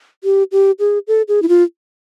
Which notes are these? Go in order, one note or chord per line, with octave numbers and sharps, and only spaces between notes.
G4
G4
G#4
A4
G#4
E4
F4